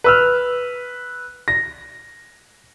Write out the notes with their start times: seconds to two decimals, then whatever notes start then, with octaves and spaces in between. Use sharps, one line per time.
0.04 B4 E6 F6
1.48 A#6